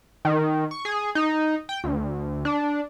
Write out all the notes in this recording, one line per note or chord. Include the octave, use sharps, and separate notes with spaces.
D#3
C#6
G#4
D#4
G5
D2
D4